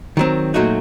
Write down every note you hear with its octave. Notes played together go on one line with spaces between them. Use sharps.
D#3 F#3 C4
A#2 F#3 A3 D#4 F#4